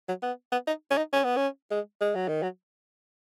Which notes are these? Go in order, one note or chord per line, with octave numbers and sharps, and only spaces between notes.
F#3
B3
B3
D#4
C#4
D#4
C#4
B3
C#4
G#3
G#3
F#3
D#3
F#3